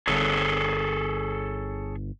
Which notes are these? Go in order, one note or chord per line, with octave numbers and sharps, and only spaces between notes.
G1 G#4 A4 C#5